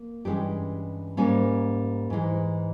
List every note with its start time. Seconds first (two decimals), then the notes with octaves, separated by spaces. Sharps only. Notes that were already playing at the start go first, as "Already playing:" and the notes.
Already playing: A#3
0.25 G2 E3 G#3 C#4 G4
1.17 G#2 G3 A#3 C#4
2.10 G#2 E3 G#3